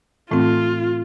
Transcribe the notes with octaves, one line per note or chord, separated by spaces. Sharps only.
A2 E3 A3 C4 F4